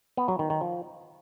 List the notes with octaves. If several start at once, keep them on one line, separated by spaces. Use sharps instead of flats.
B3
F#3
D#3
D#3
F3